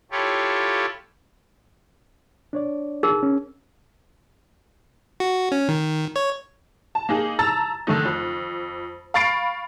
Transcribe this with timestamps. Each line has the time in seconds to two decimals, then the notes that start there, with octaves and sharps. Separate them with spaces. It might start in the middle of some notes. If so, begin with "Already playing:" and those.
0.11 E4 F4 G4 A4 C#5
2.53 D4 C#5 D5
3.03 D#4 G#4 A#4
3.23 C#4
5.20 F#4
5.52 C#4
5.68 D#3
6.16 C#5
6.95 A5
7.09 A#3 D#4 G#4
7.39 A5 A#5 E6 A6
7.87 D3 D#3 A3 D#4
8.05 F2
9.14 F5 B5 C#6 A6 C7 D7